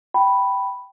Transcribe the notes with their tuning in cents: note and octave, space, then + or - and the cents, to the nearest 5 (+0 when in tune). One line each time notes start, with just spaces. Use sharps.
G5 -10 B5 +0